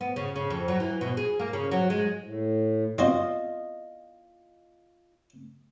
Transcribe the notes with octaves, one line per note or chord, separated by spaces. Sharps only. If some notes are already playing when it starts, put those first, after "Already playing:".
B3
C#3
C#3
F2
F#3
E3
B2
G#4
A#3
C#3
F#3
G#3
A2
C4 F4 F#4 C5 D#5